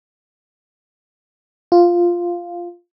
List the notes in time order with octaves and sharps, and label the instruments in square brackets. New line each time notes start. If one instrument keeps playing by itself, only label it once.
[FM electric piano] F4